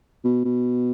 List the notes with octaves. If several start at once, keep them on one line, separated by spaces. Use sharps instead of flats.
B2
B2